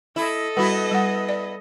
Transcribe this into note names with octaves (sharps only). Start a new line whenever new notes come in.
E4 A4 D#5
G3 B3 E4 F#4
G3 F#5
D5